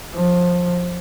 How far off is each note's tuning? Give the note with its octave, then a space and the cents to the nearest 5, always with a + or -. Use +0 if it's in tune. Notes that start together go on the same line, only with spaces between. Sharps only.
F3 +20